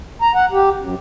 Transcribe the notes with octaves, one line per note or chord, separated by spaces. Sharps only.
A#5
F#5
G4
F#2